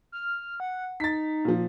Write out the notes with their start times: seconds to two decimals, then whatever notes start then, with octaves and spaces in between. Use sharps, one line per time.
0.12 F6
0.60 F#5
1.00 D#4 A6 B6
1.45 A#2 F3